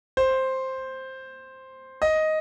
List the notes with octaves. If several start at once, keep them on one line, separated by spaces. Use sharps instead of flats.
C5
D#5